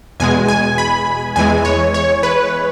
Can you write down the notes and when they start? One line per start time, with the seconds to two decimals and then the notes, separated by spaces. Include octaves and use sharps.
0.20 E2 B2 G#3 G#5
0.48 G#5
0.78 B5
1.36 E2 E3 G#3 G#5
1.65 C#5
1.94 C#5
2.23 B4